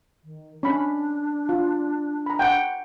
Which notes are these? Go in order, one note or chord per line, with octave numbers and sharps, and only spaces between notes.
D#3
C#4 D4 B5
F4
A#5 B5
F#5 G5